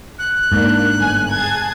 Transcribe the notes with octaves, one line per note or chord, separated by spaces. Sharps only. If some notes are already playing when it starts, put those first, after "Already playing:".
F#6
G#2 A#3 D4
G1 G#5
G#4 A5 G#6